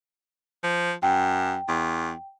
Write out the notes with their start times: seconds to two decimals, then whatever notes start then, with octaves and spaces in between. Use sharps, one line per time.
0.64 F3
1.03 F#2 G5
1.68 E2